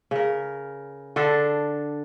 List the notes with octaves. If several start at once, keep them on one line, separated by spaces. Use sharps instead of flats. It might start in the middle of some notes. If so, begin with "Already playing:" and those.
C#3 A#4
D3 D4 A4